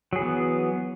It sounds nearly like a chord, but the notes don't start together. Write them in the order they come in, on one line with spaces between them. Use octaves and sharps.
F#3 G#4 E3 B3